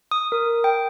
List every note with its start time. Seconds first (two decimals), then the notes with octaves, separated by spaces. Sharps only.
0.11 D#6
0.32 A#4
0.64 G5